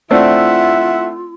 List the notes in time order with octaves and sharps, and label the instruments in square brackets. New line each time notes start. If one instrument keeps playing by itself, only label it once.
[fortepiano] A3 C4 D4 [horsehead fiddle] E4 F#5 [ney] F4 [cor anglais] E5